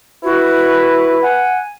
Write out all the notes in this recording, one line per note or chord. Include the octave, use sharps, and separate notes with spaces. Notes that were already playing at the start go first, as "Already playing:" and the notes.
E4 F#4 B4
F#5 G#5